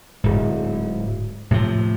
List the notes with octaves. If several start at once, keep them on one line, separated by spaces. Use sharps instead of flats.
D1 G#2
A2 C3 E3 F3